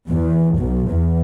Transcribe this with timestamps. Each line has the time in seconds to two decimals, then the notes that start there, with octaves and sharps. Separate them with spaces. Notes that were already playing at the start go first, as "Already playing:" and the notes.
0.10 E2
0.58 B1
0.89 E2